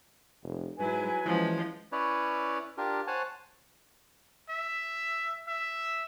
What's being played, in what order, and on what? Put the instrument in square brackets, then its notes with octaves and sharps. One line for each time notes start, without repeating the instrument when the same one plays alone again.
[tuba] F1
[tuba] G#2 [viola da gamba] F#3 E4 [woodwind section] B4 G#5
[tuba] E3 [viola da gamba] F3 G#3 C#4
[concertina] C#4 E4 B4 C#5 D5
D4 F4 G4 A#4
C5 C#5 F#5 G#5 A5
[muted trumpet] E5
E5